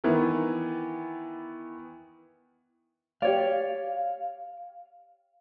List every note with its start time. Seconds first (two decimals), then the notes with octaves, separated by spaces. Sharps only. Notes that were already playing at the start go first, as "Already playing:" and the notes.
0.04 D#3 E3 B3
3.22 G4 C#5 D5 F5